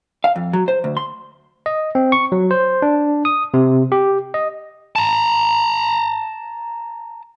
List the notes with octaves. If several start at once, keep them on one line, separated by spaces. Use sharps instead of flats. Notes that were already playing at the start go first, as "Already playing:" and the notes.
F5
F2
F#3
C5
D2
C6
D#5
C4
C#6
F#3
C5
D4
D#6
C3
G4
D#5
A5 A#5